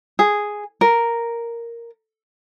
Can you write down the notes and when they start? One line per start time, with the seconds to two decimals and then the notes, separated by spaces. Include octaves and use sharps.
0.19 G#4
0.81 A#4